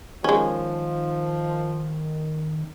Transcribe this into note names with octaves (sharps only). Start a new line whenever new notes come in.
D#3 F3 G#3 C#4